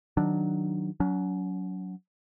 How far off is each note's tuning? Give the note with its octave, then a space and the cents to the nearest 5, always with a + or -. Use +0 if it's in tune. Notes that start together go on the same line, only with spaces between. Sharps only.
D#3 +0 F#3 +0 D4 +5
F#3 +0 C#4 +40